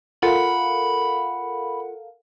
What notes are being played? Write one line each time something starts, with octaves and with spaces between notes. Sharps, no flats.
F4 A4 A#4 F5 F#5 B5